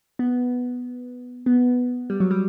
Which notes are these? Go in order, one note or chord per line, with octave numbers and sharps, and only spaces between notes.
B3
B3
G3
F#3
G3